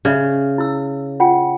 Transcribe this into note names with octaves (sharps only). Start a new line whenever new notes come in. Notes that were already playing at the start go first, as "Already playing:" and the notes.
C#3 D5 E5
E4 E6
F4 F#5 G5